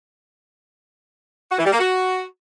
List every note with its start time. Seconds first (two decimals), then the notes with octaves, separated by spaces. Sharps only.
1.51 F#4
1.58 E3
1.65 G3
1.72 A#3
1.80 F#4